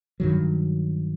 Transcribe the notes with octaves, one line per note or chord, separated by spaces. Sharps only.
G2 D#3 F#3